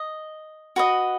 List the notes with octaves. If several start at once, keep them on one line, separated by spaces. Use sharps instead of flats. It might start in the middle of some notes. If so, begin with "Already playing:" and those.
Already playing: D#5
F#4 B4 D#5